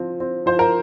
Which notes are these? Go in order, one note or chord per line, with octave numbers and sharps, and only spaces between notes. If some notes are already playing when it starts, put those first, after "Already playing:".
Already playing: F3 C4
C4
F3 C5
A#4